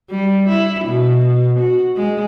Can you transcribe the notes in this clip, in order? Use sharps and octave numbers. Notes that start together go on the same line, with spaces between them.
G3
E4
B2
F#4
G#3